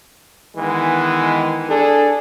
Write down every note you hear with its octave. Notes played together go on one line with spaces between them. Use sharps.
D#3 E3 G#3 B3
D4 G#4 A4